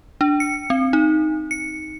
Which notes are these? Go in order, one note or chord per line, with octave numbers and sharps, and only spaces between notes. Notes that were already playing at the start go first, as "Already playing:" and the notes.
D4
C#7
C4
D#4
C#7